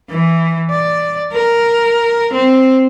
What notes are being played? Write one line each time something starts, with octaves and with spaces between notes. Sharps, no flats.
E3
D5
A#4
C4